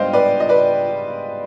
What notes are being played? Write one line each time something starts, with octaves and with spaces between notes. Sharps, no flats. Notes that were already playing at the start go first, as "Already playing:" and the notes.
Already playing: G#2 G3 B3 D4 C5 D#5 F5 G5
B4 D5
D#5
B4 D5